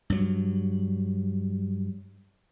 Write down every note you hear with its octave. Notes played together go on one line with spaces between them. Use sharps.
G2 F#3